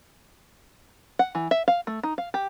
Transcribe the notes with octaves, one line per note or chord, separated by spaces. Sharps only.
F#5
E3
E5
F5
A3
D#4
F5
G4